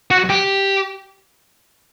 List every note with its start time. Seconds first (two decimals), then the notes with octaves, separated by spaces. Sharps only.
0.11 F#4
0.29 G4